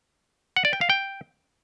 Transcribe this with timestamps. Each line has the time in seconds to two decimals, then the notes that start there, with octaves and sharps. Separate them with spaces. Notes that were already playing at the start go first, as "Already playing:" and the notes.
0.57 F#5
0.65 D5
0.73 G5
0.81 F5
0.90 G5